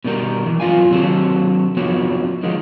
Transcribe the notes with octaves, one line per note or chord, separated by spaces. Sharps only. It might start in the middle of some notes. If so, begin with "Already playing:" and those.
B2 D#3 G3 A#4
E3
F#2 F4 F5 G#5
C3 D#3 F#3 A4
F2 F3 B3 F#4 C#5
D#3 F3 F#3 G#3